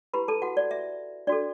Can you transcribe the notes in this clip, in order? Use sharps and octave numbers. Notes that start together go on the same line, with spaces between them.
E4 G4 B4 B5
A4 A5
F#4 F#5
D5
E5
D4 F#4 A4 D5